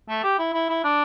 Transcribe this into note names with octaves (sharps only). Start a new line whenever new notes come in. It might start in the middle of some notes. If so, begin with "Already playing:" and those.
A3
G4
E4
E4
E4
D4